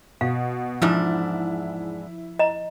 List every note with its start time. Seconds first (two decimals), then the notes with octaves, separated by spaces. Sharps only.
0.21 B2 F5
0.82 E2 G#2 F3 D4 E4
2.39 D#5 A#5